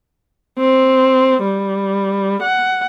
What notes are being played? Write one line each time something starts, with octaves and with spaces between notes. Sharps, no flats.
C4
G3
F#5